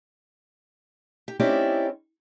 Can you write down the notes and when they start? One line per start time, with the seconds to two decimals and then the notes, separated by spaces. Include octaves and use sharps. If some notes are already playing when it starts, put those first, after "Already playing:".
1.28 G4
1.39 C4 C#4 D#4 E4 G4 D5